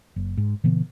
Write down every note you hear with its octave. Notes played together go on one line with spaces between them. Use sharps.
F#1
G#2
A#2 C#3 E3 B3